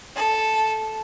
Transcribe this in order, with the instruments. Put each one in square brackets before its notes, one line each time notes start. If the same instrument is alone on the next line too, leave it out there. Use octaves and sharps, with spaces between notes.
[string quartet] A4